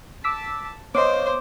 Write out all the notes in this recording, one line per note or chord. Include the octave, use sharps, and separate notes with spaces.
A5 D6 E6 B6
B3 C5 C#5 D#5 C6 D6